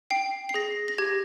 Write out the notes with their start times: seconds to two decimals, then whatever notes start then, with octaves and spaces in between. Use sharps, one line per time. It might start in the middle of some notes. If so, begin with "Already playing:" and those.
0.10 G5 C7
0.49 C7
0.54 G#4 A#6
0.88 A#6
0.98 G4 G#6